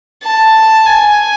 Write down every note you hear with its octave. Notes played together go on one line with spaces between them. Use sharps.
A5
G#5